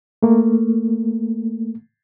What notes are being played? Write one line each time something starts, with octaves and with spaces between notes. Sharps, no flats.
A3 A#3